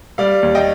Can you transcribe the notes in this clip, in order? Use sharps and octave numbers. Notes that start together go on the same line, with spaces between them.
G3 D5 F5
D#2
D#5 G5